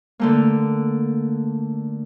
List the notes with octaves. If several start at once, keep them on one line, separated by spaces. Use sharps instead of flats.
D3 A3 A#3